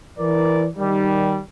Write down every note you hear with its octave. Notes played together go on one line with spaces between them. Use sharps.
E3 A#4 D5
D#3 G3